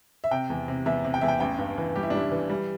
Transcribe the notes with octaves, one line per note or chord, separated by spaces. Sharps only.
E5
C3 G5
E2
C3
E2 E5
C3
G5
E2 E5
G5
A1 G5
G2
E3
G3 G4
E4
D4
G3 E4
E3
G3